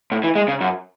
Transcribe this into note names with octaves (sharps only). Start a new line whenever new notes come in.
A2
E3
G#3
C#3
F#2